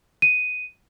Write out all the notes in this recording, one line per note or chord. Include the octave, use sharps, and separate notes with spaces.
D#7